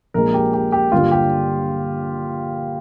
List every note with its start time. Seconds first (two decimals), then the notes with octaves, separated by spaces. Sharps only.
0.14 A#1 A#2 G#3 A#4
0.34 G4
0.53 G4
0.72 G4
0.92 G2 D3 G3 A#3 D4 F4
1.11 G4